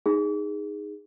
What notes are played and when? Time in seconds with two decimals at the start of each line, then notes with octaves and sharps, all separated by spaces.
0.06 D#4 G#4